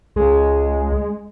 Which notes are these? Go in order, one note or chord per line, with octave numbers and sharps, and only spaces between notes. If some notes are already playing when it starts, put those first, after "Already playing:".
C#2 G#3